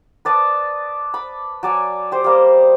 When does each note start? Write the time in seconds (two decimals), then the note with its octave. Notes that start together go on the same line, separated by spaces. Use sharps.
0.25 B4 D5 A5 D#6
1.14 B5 D6
1.63 F#3 D5 G#5
2.12 G4 C5
2.24 G3 A#3 D#5